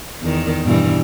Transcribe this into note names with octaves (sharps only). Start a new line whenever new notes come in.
E2 D#3
G2 B2 E3